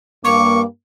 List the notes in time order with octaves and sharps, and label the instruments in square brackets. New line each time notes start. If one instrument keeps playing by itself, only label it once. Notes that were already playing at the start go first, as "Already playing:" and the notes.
[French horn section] G2 A#3 [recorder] C#6 [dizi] D6